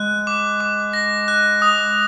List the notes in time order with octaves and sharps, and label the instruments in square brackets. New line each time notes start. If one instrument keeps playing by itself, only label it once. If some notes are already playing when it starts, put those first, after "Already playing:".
Already playing: [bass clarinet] G#3 [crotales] F#6
[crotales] D6
D6
A#6
F#6
D#6